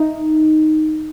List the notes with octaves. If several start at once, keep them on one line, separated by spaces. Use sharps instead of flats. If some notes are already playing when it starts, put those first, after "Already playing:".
Already playing: D#4